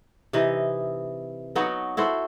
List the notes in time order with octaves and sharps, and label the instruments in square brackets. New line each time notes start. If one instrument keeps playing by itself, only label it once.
[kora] C3 E3 D#4 D#5
F#3 B3 D#4 F#4
E4 F#4 A4 C5